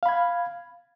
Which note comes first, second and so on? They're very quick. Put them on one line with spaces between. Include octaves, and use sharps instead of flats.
F5 B5 G#6